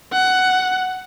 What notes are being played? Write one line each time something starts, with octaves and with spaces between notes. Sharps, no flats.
F#5